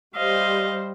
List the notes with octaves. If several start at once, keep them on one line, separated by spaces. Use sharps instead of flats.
G3 C5 D#5 F5